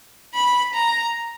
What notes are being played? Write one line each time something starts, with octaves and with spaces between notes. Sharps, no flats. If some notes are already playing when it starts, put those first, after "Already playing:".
B5
A#5